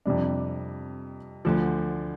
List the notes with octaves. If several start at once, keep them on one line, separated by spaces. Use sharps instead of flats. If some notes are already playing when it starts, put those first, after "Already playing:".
F2 C3 G3 D4
D2 D3 F3